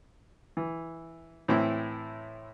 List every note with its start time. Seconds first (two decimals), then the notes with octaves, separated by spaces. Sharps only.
0.57 E3
1.48 A2 E3 C4 E4